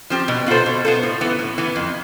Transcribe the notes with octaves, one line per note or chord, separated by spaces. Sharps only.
F3 C4 G4
B2
B3 F4 A4 C5
B2
B3 F4 A4 C5
A2
E3 B3
A2
E3 B3
F2